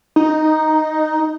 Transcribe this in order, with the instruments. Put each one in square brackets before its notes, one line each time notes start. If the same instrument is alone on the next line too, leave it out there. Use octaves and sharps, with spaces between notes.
[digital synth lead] D#4